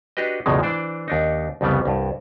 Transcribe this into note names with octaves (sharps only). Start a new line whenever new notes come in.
D4 F#4 G4 B4 D#5
B1 E2 A2 C#3 F3 G#3
E3 D4 C5 D5
D#2 D4 D#4
C2 F2 C#3 G3 B3
C2 G2